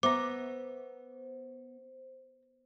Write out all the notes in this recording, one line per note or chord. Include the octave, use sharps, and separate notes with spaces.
B3 C5 E5 A#5 D6